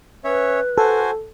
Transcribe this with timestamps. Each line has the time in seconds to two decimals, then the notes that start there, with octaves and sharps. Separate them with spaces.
0.24 C#4 B4 C#5 E5
0.78 F#4 A4 C5 G#5